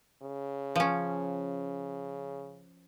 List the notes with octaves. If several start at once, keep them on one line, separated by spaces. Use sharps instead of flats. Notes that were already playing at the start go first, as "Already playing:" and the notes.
C#3
F3 C#4